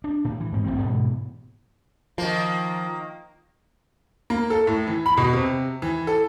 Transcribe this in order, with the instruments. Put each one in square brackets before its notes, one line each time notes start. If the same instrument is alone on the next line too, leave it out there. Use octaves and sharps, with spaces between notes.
[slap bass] D4
A2
E3
G#2 C4
A1 A#2 C4
G#2 B2 D3 E3
[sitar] D#3 A#3 [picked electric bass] F3
[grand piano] A#3
A4
A2
E3
B5
B2
C3
E3
A4